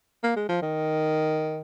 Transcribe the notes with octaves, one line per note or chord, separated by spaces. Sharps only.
A#3
G#3
F3
D#3